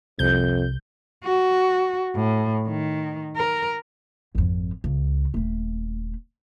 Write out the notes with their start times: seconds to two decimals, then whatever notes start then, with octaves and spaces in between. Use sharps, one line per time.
0.19 C2 F2 G6
1.24 F#4
2.15 A2
2.68 D#3
3.37 A#4
4.35 G#1 F2
4.84 C#2
5.34 D#1 A3